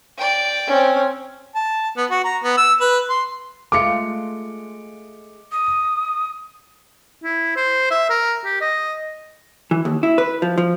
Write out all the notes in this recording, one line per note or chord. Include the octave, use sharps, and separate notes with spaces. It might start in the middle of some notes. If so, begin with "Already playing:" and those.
D5 G5
C4 C#4
A5
B3
F#4
A#5
B3
E6
B4
C6
G#3 A3 F4 D6 C#7
D#6
E4
C5
E5
A#4
G4
D#5
E3
D#2
E4
B4
F3
F3